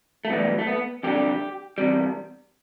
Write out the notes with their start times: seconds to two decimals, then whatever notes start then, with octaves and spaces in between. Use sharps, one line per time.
0.25 A3
0.30 B1 A2 E3 G3 B3
0.59 A3
0.67 B3
1.03 F2 D3 G3 G4
1.78 E2 C3 G3